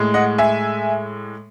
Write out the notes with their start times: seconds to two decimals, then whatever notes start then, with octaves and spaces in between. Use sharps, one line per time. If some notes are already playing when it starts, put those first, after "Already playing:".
Already playing: A2 G#3
0.14 D#5 F#5
0.38 E5 G#5